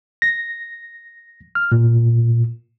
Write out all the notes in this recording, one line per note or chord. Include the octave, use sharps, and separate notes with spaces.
A#6
F6
A#2